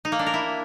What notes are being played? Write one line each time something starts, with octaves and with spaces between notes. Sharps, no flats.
D#4
A#3
D4
A#4
E4